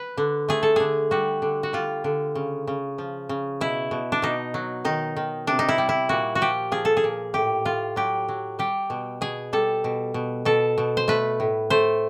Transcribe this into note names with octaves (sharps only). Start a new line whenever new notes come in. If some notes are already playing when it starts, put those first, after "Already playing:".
Already playing: B4
D3
A3 G#4
A4
D3 G#4
G3 F#4
D3
F#4
G3 F4
D3
C#3
C#3
F3
C#3
B2 E4
B2
D4
B2 D#4
F#3
D#3 D#4
D#3
C3 D4
D#4
E4
G3
E4
A#2 F#4
F#4
F3 G4
F3 G#4
A4
G#4
A#2
A2 G4
A2 F4
F#3 G4
F#3
G3 G4
B2
B2 G#4
G3 A4
B2
B2
B2 A4
B2
C5
A3 B4
A2
A3 C5